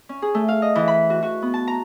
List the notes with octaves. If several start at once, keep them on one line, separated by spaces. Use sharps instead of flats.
C#4
G#4
A3
F5
D#5
E3
B5
F#4
F#4
B3
A5
A#5